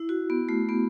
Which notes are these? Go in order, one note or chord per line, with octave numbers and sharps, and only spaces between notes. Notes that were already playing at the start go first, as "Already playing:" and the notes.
Already playing: E4
F#4
B3
A3
B3